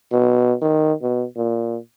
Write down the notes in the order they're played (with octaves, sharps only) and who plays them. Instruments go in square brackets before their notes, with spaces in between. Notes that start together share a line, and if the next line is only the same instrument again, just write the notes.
[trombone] B2
D#3
B2
A#2